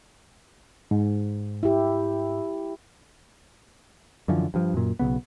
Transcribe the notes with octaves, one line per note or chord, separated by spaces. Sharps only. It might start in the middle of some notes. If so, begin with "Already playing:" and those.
G#2
E4 G4
F#2 D3 E3 F3
G2 F3
F#2 A#2
B1 E2 C#3 B3